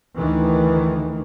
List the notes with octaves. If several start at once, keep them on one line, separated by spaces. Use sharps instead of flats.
D2 D#3 E3